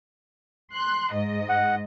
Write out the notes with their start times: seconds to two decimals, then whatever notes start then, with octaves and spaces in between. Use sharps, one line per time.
0.73 C6 F#6
1.13 G#2 D#5
1.49 F#5